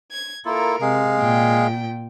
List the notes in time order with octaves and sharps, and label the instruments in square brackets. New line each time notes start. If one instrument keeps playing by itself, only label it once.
[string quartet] G#6
[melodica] A#3 E4 F4 [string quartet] A4 A#4
[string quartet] C3 [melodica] G#3 G#4 F5
[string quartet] A#2 G5